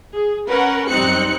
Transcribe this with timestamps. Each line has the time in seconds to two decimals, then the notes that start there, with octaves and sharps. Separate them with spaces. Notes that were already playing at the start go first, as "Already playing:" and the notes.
0.14 G#4
0.48 C#4 A#4 B4 F#5
0.88 F#2 G3 C4 D#4 F#6 C#7